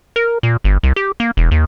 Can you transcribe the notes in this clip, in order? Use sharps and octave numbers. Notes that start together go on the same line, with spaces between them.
A#4
A#2
G1
C2
G4
A#3
E1
D#2